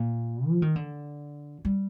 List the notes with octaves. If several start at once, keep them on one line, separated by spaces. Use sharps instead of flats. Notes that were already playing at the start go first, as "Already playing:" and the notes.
Already playing: A#2
F3
D#3
D3
G3